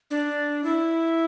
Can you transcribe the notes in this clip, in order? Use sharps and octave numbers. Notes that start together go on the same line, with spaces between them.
D4
E4